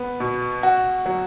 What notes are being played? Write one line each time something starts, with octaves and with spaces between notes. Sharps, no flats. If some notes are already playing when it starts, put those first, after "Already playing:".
Already playing: B3
B2
F#4
F#3